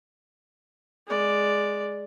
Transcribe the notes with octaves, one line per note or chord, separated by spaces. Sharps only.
G#3 D5